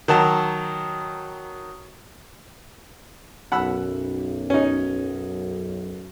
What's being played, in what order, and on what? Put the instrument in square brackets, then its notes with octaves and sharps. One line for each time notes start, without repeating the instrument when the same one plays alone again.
[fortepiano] D#3 F#3 A5
[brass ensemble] B1 F#2 [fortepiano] F#5 B5 E6
[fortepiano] C#4 D#4